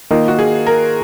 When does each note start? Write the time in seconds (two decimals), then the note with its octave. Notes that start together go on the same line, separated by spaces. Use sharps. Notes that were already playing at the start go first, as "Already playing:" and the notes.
0.11 D#3 A#3 D#4 F4
0.28 F#4
0.39 G#4
0.66 A#4